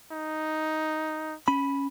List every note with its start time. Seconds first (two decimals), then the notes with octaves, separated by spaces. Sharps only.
0.12 D#4
1.48 C#4 B5